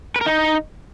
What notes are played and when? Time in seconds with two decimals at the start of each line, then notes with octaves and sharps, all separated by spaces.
0.16 B4
0.21 A#4
0.26 D#4